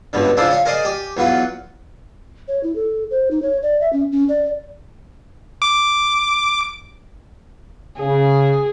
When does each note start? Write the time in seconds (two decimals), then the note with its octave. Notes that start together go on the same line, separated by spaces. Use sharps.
0.13 C#2 G2 B2 D3
0.37 C#3 C4 D4 E4 F4 C5
0.51 C#5 F5
0.65 G#4 A#4 C5 D5 D#5 G#5
0.85 G4 G#5
1.17 E2 F#3 F4 B4
2.48 C#5
2.63 E4
2.76 A4
3.11 C5
3.31 D#4
3.42 C#5
3.63 D5
3.81 E5
3.93 C#4
4.12 C#4
4.29 D5
5.62 D6
8.00 C#3 G#4